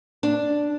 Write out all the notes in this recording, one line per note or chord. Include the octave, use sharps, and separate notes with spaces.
D4